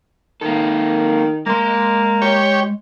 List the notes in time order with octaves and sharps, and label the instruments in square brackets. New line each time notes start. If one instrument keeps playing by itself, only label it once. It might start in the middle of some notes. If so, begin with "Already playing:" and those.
[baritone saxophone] D#3 [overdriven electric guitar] A#3 A4
[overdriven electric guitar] G#3 C6 [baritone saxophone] A#3
[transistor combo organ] G4 C#5